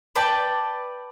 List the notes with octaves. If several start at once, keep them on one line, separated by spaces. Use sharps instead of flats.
B4 D5 G5 A5